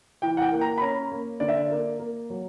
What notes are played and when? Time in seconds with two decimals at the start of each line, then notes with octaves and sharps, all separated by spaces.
0.22 E3 G5
0.37 F#5
0.42 G5
0.52 A#3
0.61 A#5
0.78 B5
0.81 C#4 A#5
1.12 A#3
1.40 D3 D5
1.48 E5
1.57 D5
1.70 A#3
1.99 A#3
2.30 F#3